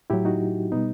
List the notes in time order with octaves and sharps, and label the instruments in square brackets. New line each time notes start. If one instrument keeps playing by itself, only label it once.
[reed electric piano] A2 F#3 E4 G4
D#4 F#4
B2 G3 B3 D#4